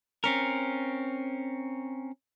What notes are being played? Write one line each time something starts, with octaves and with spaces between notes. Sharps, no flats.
C4 C#4 A#4